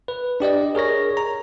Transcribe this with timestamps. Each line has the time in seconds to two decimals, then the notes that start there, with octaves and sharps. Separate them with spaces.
0.08 B4
0.40 D4 G4 D5 D#5
0.75 G#4 A#4 C#5 A#6
1.17 A#5